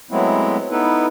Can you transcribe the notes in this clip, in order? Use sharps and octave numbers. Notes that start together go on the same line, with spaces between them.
F#3 G#3 A3 B3 C4 E4
B3 D#4 E4 A4 B4